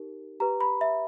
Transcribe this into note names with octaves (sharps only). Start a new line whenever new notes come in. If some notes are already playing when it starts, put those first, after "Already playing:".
Already playing: D#4 G4 A#4
G4 B4 A#5
B5
E5